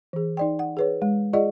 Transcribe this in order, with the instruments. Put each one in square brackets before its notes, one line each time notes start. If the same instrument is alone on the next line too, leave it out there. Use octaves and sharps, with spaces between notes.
[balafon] E3 G#4
D#4 D5 G5
F#5
G#4 B4 C#5
G#3
F4 G#4 D5 D#5 F#5